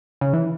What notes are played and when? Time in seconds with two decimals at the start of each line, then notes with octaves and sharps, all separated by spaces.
0.21 C#3
0.33 E3